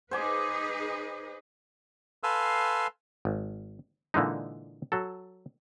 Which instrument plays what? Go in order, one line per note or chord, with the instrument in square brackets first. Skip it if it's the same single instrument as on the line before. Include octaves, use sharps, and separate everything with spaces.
[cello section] D#4 G#4 B4 [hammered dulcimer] C5 G#5 D6
[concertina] A4 B4 F5 G#5 C6 E6
[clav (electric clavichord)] G#1
A#2 D3 E3 G#3 D#4
F#3 A4